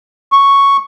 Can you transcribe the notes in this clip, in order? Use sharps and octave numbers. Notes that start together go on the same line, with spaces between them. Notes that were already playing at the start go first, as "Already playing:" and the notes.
C#6